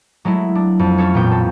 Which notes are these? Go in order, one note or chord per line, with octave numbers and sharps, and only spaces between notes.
F#3 G#3 A3 E4
D4
F2
C#4 A4 C#5
A1 A#2 B3 G5
A4